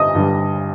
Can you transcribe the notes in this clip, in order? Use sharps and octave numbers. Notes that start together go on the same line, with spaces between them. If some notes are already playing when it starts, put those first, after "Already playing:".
Already playing: G2 D3 D#5 D#6
G2 D3 G3